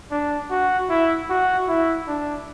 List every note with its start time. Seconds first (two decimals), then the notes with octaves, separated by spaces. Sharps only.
0.11 D4
0.50 F#4
0.89 E4
1.29 F#4
1.68 E4
2.08 D4